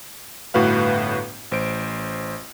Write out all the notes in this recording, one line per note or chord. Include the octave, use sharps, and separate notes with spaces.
G1 A2 F#4 B4 F5
A1 C5 D7